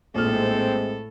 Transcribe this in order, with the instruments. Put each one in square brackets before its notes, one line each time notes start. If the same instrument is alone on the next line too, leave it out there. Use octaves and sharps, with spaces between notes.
[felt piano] A#1 F6 [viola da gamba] A2 A4 [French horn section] G#3 C4